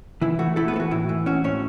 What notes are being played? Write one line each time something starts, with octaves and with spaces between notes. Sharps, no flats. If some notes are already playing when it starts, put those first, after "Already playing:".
E3 E4
A3 F#4
A3 E4 A4
B3 B4
E3 A4
F#4
A2 E4
E3
C#4 F#4
A2 C#4 C#5